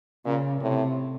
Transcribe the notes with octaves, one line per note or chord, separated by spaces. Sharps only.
A#2 C#3
A2 C3